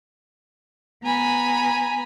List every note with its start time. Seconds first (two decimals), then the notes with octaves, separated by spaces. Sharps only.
1.02 B3 G#5 A#5 B5